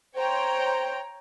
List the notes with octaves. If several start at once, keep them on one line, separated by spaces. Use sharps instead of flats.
C5 C#5 G5 A#5